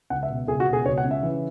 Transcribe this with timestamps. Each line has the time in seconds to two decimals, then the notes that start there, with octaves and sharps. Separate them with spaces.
0.10 C#2 F#5
0.23 E5
0.30 B2
0.48 C#2 G#4
0.60 F#4
0.67 B2
0.73 G#4
0.86 C#2 C#5
0.98 F#5
1.04 C#3
1.11 E5
1.23 E3